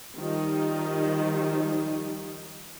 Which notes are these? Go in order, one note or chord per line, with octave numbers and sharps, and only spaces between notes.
D#3 F3 G3 D#4